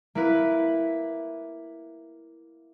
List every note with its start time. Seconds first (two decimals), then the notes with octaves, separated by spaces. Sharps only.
0.15 A#3 E4 B4